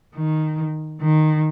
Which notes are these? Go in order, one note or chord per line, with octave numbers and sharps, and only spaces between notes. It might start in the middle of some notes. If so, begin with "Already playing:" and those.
D#3
D#3